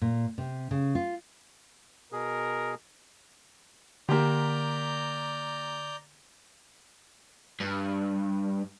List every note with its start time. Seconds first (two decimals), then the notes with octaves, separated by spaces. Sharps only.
0.01 A#2
0.38 C3
0.71 C#3
0.95 F4
2.12 B2 G#4 A#4
4.09 D3 A#3 G4 D5 A#5 G6
7.60 G2